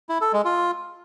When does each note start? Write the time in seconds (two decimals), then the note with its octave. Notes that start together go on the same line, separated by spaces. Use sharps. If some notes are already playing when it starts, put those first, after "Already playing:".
0.09 E4
0.21 A4
0.33 G#3
0.45 F4